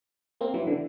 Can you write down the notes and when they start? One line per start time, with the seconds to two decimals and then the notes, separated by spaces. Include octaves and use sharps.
0.41 A#3 C4
0.54 E3 F#3
0.67 D3 E3